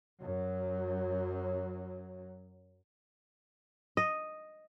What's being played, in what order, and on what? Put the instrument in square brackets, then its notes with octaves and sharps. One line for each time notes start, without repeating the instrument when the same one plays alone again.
[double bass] F#2 F#3
[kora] D#5